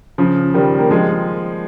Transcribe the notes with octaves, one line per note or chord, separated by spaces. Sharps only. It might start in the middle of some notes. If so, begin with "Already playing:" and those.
C#3 F3
D#3 G3
A#3
F3 G#3